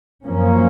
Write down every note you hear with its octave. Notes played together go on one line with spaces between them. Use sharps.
F#2 F3 A#3 C#4